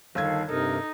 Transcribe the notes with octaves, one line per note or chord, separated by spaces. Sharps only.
G1 D#3 A4 F5 E6 G#6
G2 C3 D#4 A4 A#4